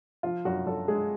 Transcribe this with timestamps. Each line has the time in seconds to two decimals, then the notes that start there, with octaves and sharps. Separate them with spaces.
0.23 F3 F4
0.45 F#2 F#4
0.66 F#2 A4
0.88 G#3 G#4